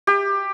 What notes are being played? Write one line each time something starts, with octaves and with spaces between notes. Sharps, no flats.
G4